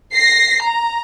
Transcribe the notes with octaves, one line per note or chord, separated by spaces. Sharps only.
A#6 C7
A#5